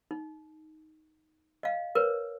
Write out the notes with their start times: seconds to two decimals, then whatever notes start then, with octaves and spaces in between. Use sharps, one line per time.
0.11 D#4
1.63 D#5 F5
1.95 A#4 B4 C#5